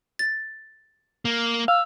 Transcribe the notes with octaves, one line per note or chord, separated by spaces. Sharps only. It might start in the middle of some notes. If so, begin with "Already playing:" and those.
A6
A#3
F5 E6